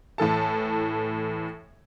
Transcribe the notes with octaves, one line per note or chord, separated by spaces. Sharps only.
A2 E3 A4 A5